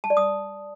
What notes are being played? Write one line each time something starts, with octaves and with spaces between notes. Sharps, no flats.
A5
D5
D#6